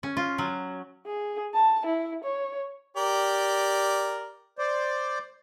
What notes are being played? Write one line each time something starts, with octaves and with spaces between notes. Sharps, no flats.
C#4
F4
F#3
G#4
A5
E4
C#5
G4 A#4 D5
C5 D5